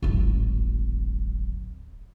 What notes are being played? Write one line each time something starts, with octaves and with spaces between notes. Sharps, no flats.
D1 G#1